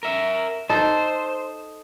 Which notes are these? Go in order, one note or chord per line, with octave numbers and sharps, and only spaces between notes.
A#4 E5
D#4 A4 C5